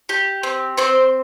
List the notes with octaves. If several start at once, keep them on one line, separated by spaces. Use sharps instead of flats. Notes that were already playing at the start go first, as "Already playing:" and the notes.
G4
C4
C4 C5